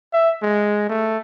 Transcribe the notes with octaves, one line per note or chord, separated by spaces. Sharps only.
E5
G#3
A3